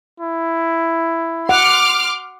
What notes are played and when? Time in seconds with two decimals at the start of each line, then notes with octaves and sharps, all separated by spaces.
0.20 E4
1.49 F#5 C6 D6 F6